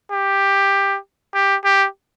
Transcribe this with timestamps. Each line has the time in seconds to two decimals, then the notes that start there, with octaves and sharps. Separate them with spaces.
0.12 G4
1.34 G4
1.65 G4